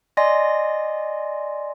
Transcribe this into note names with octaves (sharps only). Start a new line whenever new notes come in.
D5 D#5 G#5 C6 A#6